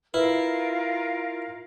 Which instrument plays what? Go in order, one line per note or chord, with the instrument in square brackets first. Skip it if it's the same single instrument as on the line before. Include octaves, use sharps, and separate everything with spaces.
[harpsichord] E4 [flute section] F4 A#4 F5 [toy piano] B4